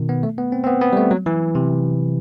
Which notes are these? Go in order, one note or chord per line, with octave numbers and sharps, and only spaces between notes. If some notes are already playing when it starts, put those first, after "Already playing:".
Already playing: B2 D#3
B3
A3
B3
C4
C4
B3
B3
G3
A3
F#3
E3
C3